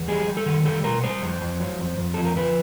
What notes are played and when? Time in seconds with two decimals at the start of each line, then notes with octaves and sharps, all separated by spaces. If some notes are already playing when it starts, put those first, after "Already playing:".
Already playing: E2
0.08 G3 G#4
0.27 G3
0.37 A4
0.46 D#3
0.65 G3 A4
0.84 B2 A#4
1.04 G3 C5
1.22 F2
1.41 F2
1.60 F#3
1.79 F2
1.98 F2
2.14 F3 A4
2.25 A#4
2.36 F3 B4